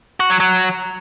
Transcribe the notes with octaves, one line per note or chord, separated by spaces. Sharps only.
F#4
F#3
F#3